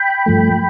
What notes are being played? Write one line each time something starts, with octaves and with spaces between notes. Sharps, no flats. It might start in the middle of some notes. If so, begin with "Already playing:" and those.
Already playing: G5 B5
G2 F3 A3